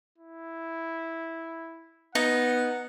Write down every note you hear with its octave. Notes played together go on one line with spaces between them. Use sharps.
E4
B3 D#4 F#5